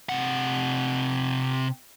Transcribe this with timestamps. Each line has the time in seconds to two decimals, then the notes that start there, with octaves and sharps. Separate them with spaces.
0.09 C3 F#5